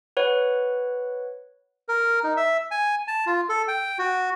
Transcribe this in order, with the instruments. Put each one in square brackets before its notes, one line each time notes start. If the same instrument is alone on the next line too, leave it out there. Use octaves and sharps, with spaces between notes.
[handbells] B4 C#5 F#5
[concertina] A#4
D#4
E5
G#5
A5
F4
A4
G5
F#4